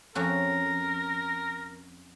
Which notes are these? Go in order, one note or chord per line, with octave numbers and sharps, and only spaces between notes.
F2 C#4 F#4 A#4